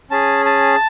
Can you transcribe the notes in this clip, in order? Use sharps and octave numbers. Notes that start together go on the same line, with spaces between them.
C#4 G#4 A5
A5